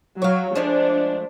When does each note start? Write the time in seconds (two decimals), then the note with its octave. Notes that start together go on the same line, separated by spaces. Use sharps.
0.22 F#3 C#5 F5
0.56 F3 G#3 A3 D4